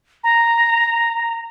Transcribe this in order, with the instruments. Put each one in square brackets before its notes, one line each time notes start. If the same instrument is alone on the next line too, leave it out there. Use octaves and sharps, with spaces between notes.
[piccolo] A#5